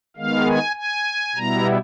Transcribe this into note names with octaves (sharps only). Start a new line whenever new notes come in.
D#3 G#3 B3 F5
G#5
G#5
B2 G3 B3 E4 A#5